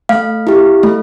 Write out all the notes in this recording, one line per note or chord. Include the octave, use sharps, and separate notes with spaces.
A3 F5
E4 G4
A3